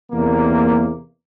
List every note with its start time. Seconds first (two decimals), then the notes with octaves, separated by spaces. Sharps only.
0.12 E2 C3 A#3